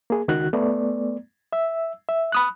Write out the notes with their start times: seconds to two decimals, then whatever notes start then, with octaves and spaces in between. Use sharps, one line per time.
0.10 A#3 G#4
0.28 C#2 D#3 F#4 F#6
0.53 A3 B3 D5
1.53 E5 E6
2.09 E5
2.32 B5 D#6 F#6